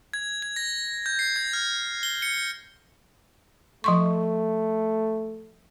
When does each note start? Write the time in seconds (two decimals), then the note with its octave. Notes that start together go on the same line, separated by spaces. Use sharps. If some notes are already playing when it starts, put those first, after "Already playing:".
0.14 G#6
0.42 G#6
0.56 A#6
1.06 G6
1.19 C7
1.36 G#6
1.53 F6
2.03 G7
2.22 C#7
3.84 F3 A3 C6 C#6